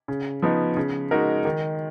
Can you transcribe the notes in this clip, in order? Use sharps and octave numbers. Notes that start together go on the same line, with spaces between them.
C#3
F3 B3 D#4
C#3
G#3 D#4 F#4 A#4
D#3